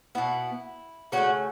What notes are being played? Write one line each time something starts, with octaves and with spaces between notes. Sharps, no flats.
B2 B3 E4
C#3 A3 C#4 F#4